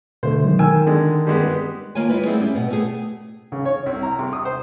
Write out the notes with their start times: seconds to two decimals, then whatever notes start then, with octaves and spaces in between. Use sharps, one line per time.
0.23 B2 D3 A3 C5
0.44 D#3 F#3 G#3
0.59 D#3 A#4 G5 G#5 E6
0.87 D3 G#3
1.27 G3 G#3 B3
1.95 D#3 A#3 F4 C#5 G#5
2.09 G3 G#3 E4 B4
2.26 G3 A3 B3 C4 E4 G#4
2.41 C#4 G4
2.54 B2 B3 C4
2.70 A3 B3 G4 G#4
3.52 C#3
3.65 C#5
3.86 C2
4.03 A#5
4.19 C3
4.33 D#6
4.45 C5